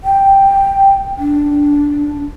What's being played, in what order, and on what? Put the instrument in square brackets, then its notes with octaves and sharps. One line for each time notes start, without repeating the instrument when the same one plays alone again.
[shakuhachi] G5
D4